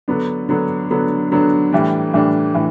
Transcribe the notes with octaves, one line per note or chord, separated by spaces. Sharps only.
D3 F#3 B3 D4
D3 F#3 B3 D4
D3 F#3 B3 D4
D3 F#3 B3 D4
A2 E3 G3 D4
A2 E3 G3 D4
A2 E3